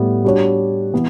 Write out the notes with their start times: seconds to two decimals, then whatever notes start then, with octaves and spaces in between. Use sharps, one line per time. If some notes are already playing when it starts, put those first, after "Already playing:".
Already playing: A2 G3 B3
0.25 G3 D4 F#4 C#5
0.93 E3 B3